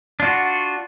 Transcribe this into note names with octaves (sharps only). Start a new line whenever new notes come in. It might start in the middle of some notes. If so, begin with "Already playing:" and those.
D4 F4 F#4